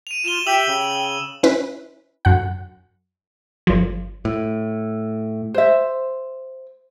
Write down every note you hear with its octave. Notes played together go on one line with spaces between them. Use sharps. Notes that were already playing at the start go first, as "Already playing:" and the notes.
D#7 F7
F4 E7 F7 G7
G4 E5 G5 E6 F7 F#7
C#3
C#4 E4 B4
F#2 F#5
G1 F3
A2
C5 E5